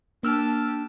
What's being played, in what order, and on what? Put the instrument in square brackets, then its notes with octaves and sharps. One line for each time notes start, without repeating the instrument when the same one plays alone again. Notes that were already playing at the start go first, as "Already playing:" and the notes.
[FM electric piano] A#3 E6 F6 [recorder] D4 [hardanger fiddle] G4 A5